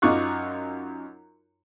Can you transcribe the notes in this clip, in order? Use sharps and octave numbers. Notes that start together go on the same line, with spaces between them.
F#2 D#4 F4 C#6 D6 F#6